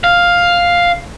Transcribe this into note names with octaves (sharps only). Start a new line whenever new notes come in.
F5